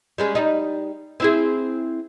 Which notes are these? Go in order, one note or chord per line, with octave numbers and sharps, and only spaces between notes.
G3 G#3 C#4
G3 D#4
C4 E4 G#4